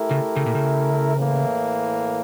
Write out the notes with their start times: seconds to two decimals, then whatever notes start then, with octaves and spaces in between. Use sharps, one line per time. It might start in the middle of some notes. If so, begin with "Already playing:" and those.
Already playing: A3 E4 G4 A#4
0.11 C#3
0.36 C#3
0.46 A#2
0.55 C#3
1.15 A2 E3 A#3